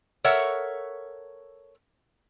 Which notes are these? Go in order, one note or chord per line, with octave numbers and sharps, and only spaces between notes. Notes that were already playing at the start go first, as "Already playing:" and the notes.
A4 A#4 C#5 E5 F#5